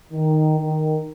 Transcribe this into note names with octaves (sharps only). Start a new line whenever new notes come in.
D#3
D#3